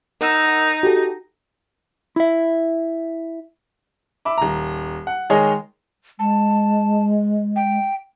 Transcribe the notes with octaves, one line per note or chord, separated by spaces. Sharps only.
D#4 A#4 F#5 E6
F#4 G4 A4
E4 E5
E5 B5 D6
D#1 A#5
F#5
D#3 G#3 G#4 C#5 D#5
G#3 A5
G5